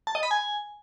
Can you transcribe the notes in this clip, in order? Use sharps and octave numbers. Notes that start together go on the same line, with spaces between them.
A5
D#5
B5
G#5